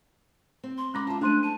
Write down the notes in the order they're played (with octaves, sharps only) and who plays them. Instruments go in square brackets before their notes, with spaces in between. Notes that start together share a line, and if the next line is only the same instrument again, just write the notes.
[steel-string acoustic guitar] C4
[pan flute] C6
[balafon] G#3 C#4 D6 [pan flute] B5
[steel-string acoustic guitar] F4 E5 [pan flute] A5
[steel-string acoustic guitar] A3 E4 C5 [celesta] D4 C6 D#7 [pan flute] F#6
[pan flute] A5 [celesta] D#7